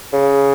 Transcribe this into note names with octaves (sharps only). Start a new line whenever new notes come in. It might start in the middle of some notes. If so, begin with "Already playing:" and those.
C#3